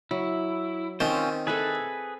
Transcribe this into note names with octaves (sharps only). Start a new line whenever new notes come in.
F#3 E4
D#3 C4 C#4 F4 C5
G#4 A4 B4 E5 G#5